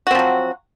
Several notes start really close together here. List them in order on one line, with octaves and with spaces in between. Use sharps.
F#4 C4 F3 F#3